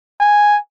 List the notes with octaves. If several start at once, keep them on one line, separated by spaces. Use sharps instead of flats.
G#5